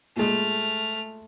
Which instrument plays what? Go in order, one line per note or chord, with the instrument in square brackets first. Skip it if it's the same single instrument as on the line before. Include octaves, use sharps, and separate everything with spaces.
[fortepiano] A#2 G#3 [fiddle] A3 F6